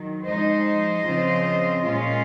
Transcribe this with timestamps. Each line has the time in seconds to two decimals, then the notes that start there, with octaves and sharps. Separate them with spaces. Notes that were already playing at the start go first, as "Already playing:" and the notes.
Already playing: D#3 F#3
0.25 F3 G#3 D#4 C5 D#5
1.04 C#3 F3 C4 F4
1.82 A#2 G#3 C#4 F4